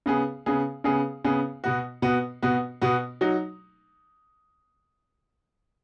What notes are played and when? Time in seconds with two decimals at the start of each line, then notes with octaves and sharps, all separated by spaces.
0.06 C#3 B3 G#4
0.46 C#3 B3 G#4
0.84 C#3 B3 G#4
1.24 C#3 B3 G#4
1.64 B2 B3 F#4
2.02 B2 B3 F#4
2.42 B2 B3 F#4
2.81 B2 B3 F#4
3.21 F#3 D#4 F#4